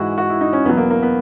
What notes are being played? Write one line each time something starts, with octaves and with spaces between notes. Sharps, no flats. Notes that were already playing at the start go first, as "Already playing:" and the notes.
Already playing: G#2 E3 G#3 E4 F#4
F#4
E4
D#4
C#4
E2 B2 F#3 B3
A#3
A#3
B3